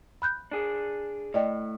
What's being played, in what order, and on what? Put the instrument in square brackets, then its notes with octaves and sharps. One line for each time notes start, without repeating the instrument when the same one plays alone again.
[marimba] B5 F#6 G6
[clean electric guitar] D4 G#4
[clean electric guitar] A2 [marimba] D5 D#5 G5